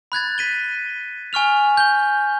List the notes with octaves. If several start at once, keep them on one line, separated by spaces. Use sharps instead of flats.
B5 F#6 G#6 A6
B6 D#7 G7
G#5 C#6 F6 F7
G6 G7